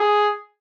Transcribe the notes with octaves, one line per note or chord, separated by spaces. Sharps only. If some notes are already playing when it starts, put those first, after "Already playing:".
Already playing: G#4